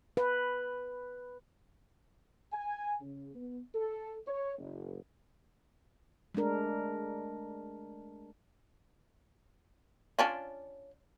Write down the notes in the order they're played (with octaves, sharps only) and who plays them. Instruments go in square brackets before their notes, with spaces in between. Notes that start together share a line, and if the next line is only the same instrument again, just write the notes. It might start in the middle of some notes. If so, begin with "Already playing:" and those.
[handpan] B4
[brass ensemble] G#5
C#3
B3
A4
C#5
F#1
[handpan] G#3 A3 D4 A#4
[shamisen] C#4 D4 F4